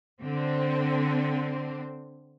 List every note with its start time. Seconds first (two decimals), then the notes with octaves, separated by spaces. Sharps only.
0.22 D3 C4